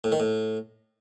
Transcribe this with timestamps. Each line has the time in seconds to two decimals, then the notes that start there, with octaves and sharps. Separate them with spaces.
0.04 A2
0.12 D#3
0.20 A2